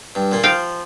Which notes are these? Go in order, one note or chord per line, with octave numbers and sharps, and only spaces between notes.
G2
A#2 A#3
F3 F5 G5